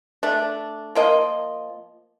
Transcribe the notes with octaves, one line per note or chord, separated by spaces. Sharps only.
A3 D4
F3 A#3 D#5